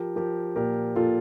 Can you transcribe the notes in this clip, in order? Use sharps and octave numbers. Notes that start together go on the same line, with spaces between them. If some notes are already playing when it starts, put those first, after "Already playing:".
Already playing: F3 G4 A#4
F3 G4 A#4
A#2 G4 A#4
A#2 F4 A4